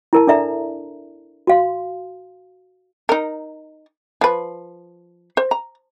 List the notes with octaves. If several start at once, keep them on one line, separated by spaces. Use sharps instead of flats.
E4 A#4 A5
D4 A4 D5 E5 A#5
F#4 F5 C6
D#4 A#4
F3 B4
C5
A#5